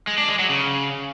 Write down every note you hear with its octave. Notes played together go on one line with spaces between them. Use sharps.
G#3
D4
G#3
F#3
C#3